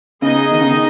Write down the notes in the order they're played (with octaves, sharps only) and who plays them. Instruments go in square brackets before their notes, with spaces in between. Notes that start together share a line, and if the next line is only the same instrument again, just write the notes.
[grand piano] C#3 [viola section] B3 D#4 G#4 D#5
[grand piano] D#3
C#3
D#3